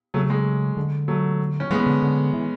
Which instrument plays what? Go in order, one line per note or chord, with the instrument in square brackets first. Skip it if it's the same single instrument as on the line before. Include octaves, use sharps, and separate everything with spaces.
[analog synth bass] C#3 [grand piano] F#3 A3
[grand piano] G#3
[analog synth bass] D3
[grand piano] F#3 A3
C#4
[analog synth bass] E3 [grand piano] G#3 B3
[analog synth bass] D3
D3
E3